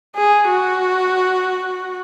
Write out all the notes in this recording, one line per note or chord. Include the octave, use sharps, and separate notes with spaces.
G#4
F#4